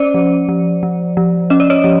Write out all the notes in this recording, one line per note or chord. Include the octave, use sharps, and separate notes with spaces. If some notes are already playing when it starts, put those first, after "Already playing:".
Already playing: C#4 C5 D5
F3
F3
F3
F3
C#4 D#5
D5
C#5 D#5
F3